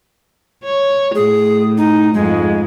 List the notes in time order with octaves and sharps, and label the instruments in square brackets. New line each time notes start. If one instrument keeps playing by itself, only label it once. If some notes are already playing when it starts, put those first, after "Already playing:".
[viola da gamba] C#5
[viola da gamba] A2 [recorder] G#4
[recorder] D#4
[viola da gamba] F2 G#2 [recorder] G#3